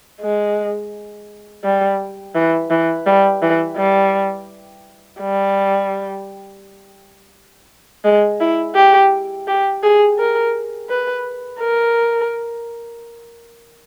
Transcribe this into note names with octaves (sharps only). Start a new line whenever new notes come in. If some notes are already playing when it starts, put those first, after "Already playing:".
G#3
G3
E3
E3
G3
E3
G3
G3
G#3
E4
G4
G4
G#4
A#4
B4
A#4